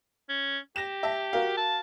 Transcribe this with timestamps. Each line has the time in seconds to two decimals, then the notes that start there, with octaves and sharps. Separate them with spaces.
0.29 C#4
0.76 G4 A#6 E7
1.03 E5 A5
1.33 F#4 A#4 F5
1.57 A5